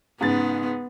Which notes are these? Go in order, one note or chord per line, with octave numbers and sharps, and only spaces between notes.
G#2 C#3 B3 A6